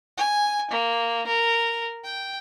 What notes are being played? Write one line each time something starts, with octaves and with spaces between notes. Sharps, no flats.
G#5
A#3
A#4
G5